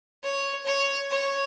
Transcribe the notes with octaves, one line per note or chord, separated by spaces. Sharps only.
C#5
C#5
C#5